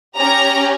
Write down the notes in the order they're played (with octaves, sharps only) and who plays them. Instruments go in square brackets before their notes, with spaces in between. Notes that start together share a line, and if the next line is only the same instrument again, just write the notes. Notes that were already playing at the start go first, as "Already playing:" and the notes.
[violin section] C#4 G4 A#5